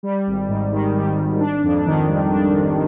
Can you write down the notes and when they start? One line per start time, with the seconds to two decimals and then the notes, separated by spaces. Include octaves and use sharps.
0.03 G3
0.27 G#1
0.49 G#2
0.72 D#3
0.94 G3
1.17 G#1
1.40 D4
1.63 F2
1.86 D#3
2.09 G3
2.32 D4
2.55 F2